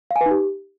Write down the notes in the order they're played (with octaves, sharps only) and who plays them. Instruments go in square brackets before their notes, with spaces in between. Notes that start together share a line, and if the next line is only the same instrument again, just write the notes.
[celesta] F5
G#5
B4
D#4
G4